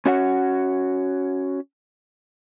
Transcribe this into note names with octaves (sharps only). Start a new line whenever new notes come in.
C#4 F#4 C#5 F#5